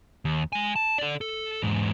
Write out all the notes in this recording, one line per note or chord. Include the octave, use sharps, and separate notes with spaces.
D#2
G#3 G#5
A5
A4 D5
A4
E2 G#2